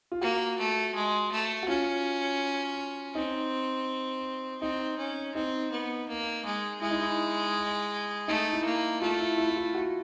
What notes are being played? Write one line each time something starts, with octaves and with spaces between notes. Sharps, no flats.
F4
A#3 F#4
A3
G#3
A3
F#4
C#4 F4
C4 D#4
C4 D#4
C#4
C4 D#4
B3
A#3
G#3
G#3 E4
D#4
E4
A3 D#4
E4
A#3
A3 F4
E4
E4
E4
F4
F#4